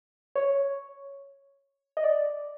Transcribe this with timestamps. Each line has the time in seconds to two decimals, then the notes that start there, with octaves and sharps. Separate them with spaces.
0.36 C#5
1.97 D#5
2.04 D5